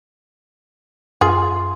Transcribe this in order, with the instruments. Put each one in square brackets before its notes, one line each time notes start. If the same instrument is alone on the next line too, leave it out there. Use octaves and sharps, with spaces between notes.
[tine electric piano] F#2 C6 [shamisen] F4 G#4